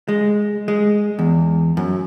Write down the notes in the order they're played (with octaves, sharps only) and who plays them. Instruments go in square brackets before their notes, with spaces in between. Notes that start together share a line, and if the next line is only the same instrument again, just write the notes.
[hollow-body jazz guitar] G#3
G#3
E2
F#2